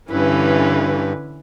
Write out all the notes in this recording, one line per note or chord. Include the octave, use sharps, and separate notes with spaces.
G2 D3 E3 C#4 E4 B4